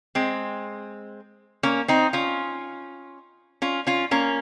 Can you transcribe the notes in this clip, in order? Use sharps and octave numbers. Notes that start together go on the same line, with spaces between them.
G#3 C4
A#3 C#4
C4 D#4
C#4 F4
C#4 F4
C#4 F4
A#3 C#4